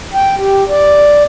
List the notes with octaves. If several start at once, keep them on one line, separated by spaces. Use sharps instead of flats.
G5
G4
D5